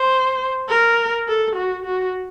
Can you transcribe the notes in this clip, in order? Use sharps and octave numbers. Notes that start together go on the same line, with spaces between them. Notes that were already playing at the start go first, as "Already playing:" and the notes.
Already playing: C5
A#4
A4
F#4
F#4